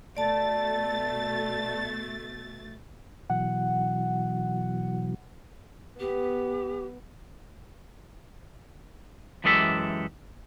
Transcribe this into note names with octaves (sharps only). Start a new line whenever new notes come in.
B2 A3 D5 A5 A6
B2 E3 F#3 F#5
B3 G4
F#2 E3 G#3 G4 A4 E5